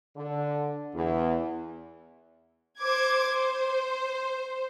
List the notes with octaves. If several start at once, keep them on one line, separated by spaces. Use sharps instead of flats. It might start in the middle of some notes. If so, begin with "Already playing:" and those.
D3
E2
C5 D6 G#6
C5